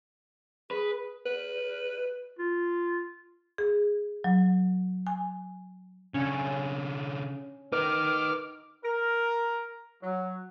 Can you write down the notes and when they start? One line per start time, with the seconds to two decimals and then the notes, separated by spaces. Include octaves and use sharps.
0.71 G#4 B4
1.26 B4
2.39 F4
3.58 G#4
4.24 F#3
5.07 G#5
6.14 C#3 C#4 D4
7.73 D#4 A#4 B4 D6 F6
8.83 A#4
10.02 F#3